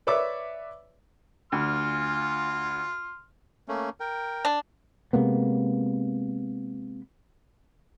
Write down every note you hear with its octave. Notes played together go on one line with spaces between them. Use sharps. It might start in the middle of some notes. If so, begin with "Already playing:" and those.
B4 C#5 D5 E5 D6 E6
D2 C6 F6
A3 A#3 C#4
A#4 G5
D4
C3 G#3 A#3 B3